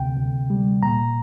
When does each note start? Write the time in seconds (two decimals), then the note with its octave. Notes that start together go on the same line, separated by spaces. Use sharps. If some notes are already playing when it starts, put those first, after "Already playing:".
Already playing: D2 C3 G5
0.17 D2
0.50 G3
0.83 A#2 A#5